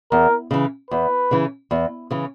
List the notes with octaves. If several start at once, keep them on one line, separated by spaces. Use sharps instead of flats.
E2 A#4
C#3 E3
E2 B4
C#3 E3
E2
C#3 E3